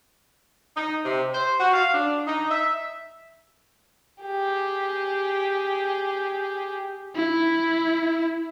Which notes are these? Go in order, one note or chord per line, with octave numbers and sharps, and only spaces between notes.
D#4
C3
C5
F#4
F5
D4
D#4
E5
G4 G#4
E4